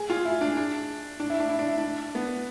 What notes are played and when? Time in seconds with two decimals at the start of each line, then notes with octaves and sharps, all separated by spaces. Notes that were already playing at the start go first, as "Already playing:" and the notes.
Already playing: G#4
0.10 F4
0.25 E4
0.41 D4
0.57 D4
1.20 D4
1.30 E4
1.40 D4
1.49 E4
1.59 D4
1.68 E4
1.78 D4
2.15 B3